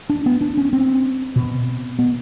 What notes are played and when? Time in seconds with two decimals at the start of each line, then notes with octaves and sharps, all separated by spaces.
0.10 D4
0.26 B3
0.41 D4
0.57 C#4
0.73 C4
1.36 B2
1.99 B3